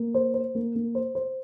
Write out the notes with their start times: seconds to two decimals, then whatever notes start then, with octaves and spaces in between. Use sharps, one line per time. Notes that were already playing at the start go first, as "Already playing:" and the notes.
Already playing: A#3
0.14 C5
0.34 C5
0.55 A#3
0.75 A#3
0.95 C5
1.15 C5